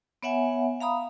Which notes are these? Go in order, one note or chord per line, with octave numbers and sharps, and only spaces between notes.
B3 C#5 E5 F#5 G#5
F5 A#5 B5 D#6